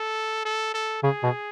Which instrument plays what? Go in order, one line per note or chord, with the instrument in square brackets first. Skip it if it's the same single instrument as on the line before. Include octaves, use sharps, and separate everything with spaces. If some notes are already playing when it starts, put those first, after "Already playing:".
Already playing: [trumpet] A4
A4
A4
[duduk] C#3 [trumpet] G#4
[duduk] B2